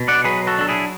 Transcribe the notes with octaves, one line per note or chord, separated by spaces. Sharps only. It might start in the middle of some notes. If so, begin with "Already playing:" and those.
Already playing: B2
D5 F#5
F#3 G#4 B4
F#4 A4
D4 A4
E4 G#4